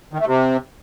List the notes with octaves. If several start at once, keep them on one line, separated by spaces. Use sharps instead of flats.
D#3
A3
C3